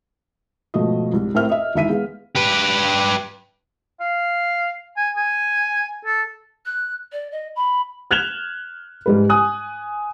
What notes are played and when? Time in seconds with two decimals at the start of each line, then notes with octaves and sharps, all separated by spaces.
0.74 G#1 B2 F3 A3 A4 D#5
1.12 C2 G#2
1.34 A2 C4 A#4 E5 F6
1.50 D#5 E5
1.74 E1 D#3 E4 E5 B6 D#7
1.89 G#3 B3 G#4 F5
2.36 G4 B4
4.00 F5
4.97 G#5
5.16 G#5
6.05 A4
6.65 F#6
7.12 D5
7.31 D#5
7.56 B5
8.11 F6 F#6 G#6 E7 F7 G7
9.06 G#2 G3 B4
9.29 G#5 D#6 F#6